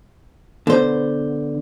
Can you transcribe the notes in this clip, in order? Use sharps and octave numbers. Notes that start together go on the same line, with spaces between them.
D3 B3 C5